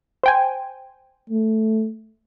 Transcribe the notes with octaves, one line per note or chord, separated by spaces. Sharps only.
C5 G5 G#5
A3